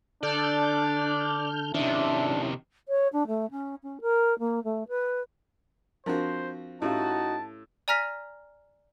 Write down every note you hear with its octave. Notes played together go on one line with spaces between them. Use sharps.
D3 D4 A4 D5 F6 G6
C3 D#3 C#4 D4 E4 E5
C#5
D4
A3
C#4
C#4
A#4
A#3
A3
B4
F3 C4 D4 F#4 A#4 C5
A2 C#4 D#4 F#4 G4 F5 A5
D5 G#5 A#5 F6 A#6 B6